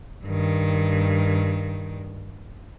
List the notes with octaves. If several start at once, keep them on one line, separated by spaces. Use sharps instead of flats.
G2 D#3